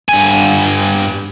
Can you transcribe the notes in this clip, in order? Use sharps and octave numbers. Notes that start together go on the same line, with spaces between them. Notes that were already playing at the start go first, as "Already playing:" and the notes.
G2 G#5